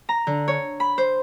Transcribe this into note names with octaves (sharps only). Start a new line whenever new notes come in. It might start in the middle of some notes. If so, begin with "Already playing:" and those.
A#5
D3
C#5
B5
C5